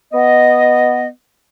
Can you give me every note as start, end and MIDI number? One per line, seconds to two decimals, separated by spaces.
0.12 1.07 59
0.12 1.07 75